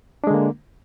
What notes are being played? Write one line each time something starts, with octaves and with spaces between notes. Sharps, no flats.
D3 G#3 A#3 D4